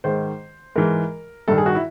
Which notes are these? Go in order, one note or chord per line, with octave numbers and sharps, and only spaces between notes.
G#2 D#3 C5
G#2 E3 A#4
G2 D#3 A4
G#4
F#4
E4